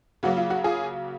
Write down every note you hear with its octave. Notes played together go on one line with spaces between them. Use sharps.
C#3 F#3 A#3 F#4
F4
F#4
F4 G#4